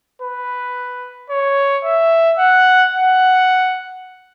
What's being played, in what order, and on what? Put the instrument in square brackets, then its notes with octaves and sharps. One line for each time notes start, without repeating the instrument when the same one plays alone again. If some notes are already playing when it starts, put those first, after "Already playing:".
[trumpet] B4
C#5
E5
F#5
F#5